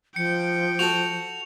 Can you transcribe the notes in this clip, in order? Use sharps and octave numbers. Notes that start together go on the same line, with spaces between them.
F3 G5 C#7
F#4 A4 F7